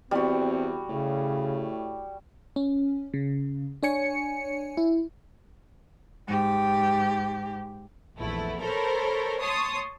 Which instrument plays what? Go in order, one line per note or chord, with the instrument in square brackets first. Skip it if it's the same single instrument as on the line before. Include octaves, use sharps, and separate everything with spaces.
[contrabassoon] E2 [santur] G3 F#4 [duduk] C4
[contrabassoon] A2 [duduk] C#3
[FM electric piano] C#4
C#3
D4 C#5 G#5 C#7
E4
[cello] G#2 G4
[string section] A#1 E2 A3 B3 E4
A4 A#4 C5 C#5 B5
C#5 A5 C6 C#6 D#6